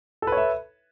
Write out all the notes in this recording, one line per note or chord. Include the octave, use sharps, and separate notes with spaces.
A4 B4 C#5 E5